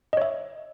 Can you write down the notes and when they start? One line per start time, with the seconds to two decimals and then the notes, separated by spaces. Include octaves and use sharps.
0.13 D#5
0.17 C#5
0.22 E5